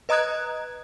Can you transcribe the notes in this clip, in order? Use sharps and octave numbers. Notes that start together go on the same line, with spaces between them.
B4 D#5 A#5 D#6 F#6 G#6